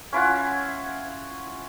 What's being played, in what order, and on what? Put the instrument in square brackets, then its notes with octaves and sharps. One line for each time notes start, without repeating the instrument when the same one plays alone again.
[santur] C#4 E4 F4 F#5